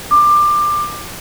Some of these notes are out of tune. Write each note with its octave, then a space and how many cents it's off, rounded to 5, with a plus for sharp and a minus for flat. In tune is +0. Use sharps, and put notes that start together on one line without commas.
D6 +20